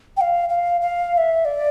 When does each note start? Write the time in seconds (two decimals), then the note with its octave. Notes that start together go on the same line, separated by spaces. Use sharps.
0.17 G5
0.21 F5
0.49 F5
0.81 F5
1.13 F5
1.17 E5
1.45 D5